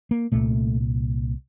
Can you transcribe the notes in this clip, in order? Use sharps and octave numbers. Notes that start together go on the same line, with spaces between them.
A#3
C2 A#2 A3